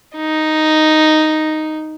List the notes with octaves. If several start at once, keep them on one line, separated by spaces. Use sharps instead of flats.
D#4